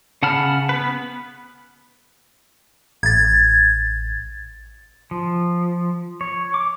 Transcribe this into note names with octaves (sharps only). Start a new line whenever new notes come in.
C#3 F#5 A5 B5 F6
B3 B4
A1 G#6 A6
F3
C#5
D6